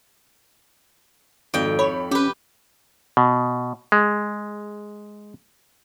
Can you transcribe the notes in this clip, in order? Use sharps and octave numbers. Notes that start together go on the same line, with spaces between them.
G#1 F2 G5
C#5 B5
C#4 G4 B4
B2
G#3